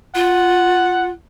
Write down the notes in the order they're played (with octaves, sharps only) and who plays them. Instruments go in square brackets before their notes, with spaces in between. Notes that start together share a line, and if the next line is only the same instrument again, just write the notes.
[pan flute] F4 [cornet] F#5